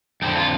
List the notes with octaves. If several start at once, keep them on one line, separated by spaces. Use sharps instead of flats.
F2 D3 C4
F4